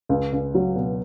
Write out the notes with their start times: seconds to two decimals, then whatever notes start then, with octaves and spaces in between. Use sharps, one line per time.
0.09 C#2
0.33 C#2
0.54 F#3
0.76 B2